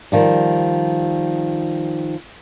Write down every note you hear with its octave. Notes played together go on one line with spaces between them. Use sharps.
D#3 F3 G3